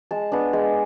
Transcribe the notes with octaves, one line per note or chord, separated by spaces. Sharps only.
G#3 A5
B3 D4
G#3